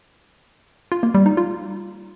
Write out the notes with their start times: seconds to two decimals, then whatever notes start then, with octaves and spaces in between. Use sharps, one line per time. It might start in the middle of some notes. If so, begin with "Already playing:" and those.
0.92 F4
1.03 A#3
1.14 G3
1.26 D#4
1.37 F4